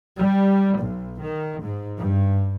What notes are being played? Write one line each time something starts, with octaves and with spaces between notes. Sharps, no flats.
G3
B1
D#3
G#2
G2